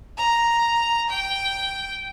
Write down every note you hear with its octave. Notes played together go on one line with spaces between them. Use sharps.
A#5
G5